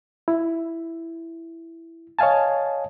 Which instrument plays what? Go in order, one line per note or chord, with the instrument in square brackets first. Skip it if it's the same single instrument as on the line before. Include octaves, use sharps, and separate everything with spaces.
[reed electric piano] E4
C#5 D#5 F5 G#5 A5